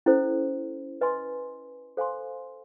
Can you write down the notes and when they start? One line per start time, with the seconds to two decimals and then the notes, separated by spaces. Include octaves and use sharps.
0.06 C#4 E4 A4 C5
1.01 B4 D#5 G#5 C6
1.97 A4 C5 F5 G#5 C6